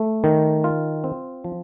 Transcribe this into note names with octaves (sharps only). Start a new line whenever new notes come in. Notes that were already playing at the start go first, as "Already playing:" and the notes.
Already playing: A3
D#3
F4
C4
F3